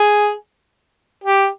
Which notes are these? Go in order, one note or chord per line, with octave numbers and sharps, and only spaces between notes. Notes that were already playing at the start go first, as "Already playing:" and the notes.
Already playing: G#4
G4